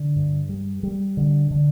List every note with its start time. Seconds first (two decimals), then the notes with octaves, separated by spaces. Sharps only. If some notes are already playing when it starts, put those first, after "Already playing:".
Already playing: D3
0.16 G2
0.49 G3
0.83 G3
1.17 D3
1.51 D3